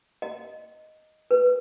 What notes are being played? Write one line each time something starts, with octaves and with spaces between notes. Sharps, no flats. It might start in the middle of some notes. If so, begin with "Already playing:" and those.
D#5
B4